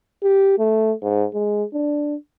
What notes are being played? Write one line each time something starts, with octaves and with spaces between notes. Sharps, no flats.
G4
A3
G#2
G#3
D4